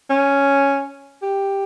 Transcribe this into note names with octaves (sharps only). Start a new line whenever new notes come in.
C#4
G4